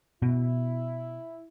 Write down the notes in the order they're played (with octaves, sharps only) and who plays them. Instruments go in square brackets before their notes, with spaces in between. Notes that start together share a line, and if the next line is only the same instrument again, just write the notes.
[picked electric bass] B2 [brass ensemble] E4